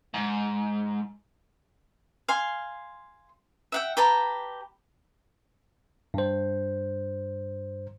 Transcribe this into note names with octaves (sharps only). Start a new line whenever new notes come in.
G#2
F5 G#5 C6
E5 F#5 G5
G4 B4 A5 A#5
G2 C5